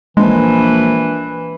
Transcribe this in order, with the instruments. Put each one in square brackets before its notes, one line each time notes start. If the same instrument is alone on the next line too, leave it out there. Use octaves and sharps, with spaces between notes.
[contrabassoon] A#1 [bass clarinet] E3 [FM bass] G#3